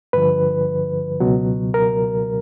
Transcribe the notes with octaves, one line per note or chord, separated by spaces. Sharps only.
G2 D3 F3 B4
C#2 B2 F#3
A#4